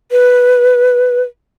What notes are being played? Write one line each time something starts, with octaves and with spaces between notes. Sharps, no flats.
B4